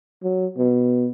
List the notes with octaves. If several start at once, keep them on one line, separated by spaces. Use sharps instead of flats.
F#3
B2